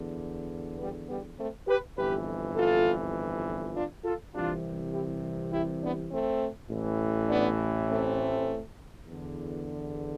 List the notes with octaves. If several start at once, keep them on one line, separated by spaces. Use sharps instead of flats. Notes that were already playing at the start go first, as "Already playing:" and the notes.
Already playing: E2 D3
G3 B3
G3 B3
A3 C4
G4 B4
G1 F2 E3 G4 B4
F4 A4
D4 F4
F4 A4
C2 C3 E3 D4 F4
E4 G4
E4 G4
B3 D4
A3 C4
A1 A2 E3
B3 D4
A3 C4
E2 D3